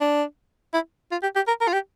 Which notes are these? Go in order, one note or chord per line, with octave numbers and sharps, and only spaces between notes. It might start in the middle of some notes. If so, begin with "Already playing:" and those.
D4
E4
F4
G4
G4
A#4
A#4
F4
G4